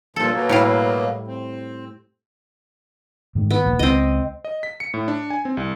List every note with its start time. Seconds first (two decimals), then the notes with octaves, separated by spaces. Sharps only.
0.16 G2 A#2 F3 A4
0.33 B2 F#3 A#3
0.49 A2 G3 F5
1.27 C4
3.35 G#2 D#3 A3
3.50 B3
3.64 D#1 A#1 D#2
3.79 C#2 C4 D#5
4.45 D#5
4.63 B6
4.80 C#7
4.94 A2
5.08 D4
5.30 G#5
5.45 C4
5.57 C2